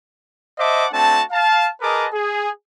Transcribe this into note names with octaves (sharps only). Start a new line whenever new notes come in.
C5 D#5 E5 F#5 A5 D6
A3 C4 D4 F#4 A5
F5 A5
G#4 A#4 B4 D#5 A5 D6
G#4